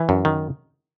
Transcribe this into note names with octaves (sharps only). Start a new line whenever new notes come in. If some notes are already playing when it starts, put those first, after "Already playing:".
Already playing: E3
F#2
D#3